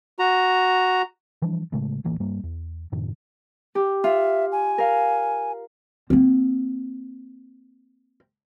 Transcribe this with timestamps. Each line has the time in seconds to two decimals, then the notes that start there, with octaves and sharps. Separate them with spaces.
0.19 F#4 A#5
1.42 E3 F3 G3 D4
1.72 A2 C#3 G#3 A3
2.04 D1 A1 E3 A#3
2.20 G2 G3 A#3
2.43 E2
2.92 F#2 A2 C3 D#3
3.75 G4
4.04 F4 E5
4.52 G#5
4.78 A#4 F5
6.10 A#3 C4